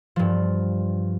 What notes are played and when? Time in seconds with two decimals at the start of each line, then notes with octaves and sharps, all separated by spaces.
0.16 G2 F3